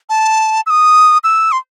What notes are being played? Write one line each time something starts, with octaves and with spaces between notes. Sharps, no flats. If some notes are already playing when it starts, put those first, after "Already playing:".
A5
E6
D#6
E6
C6